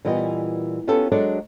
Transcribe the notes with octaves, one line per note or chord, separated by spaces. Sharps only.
A#2 E3 G3 B3 D#5
B3 C#4 F4 G4 A4
F#3 G#3 D4 A4 C#5 D5